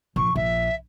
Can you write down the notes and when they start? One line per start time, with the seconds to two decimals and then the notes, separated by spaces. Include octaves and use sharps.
0.16 A#1 C#6
0.36 A#1 E5